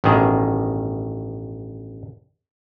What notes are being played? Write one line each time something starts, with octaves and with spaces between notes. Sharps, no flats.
A1 G2 B2 D#3 G#4